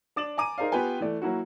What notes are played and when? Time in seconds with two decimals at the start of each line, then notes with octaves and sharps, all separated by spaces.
0.16 D4 D6 A6 E7 F#7
0.37 G#5 A#5 D6 D#7
0.58 D#4 G#4 A#4 C5 D5 F5
0.72 B3 F4 G4 B4 G5 G#5
1.01 E3 A3 D5
1.22 F#3 A#3 E4 F#4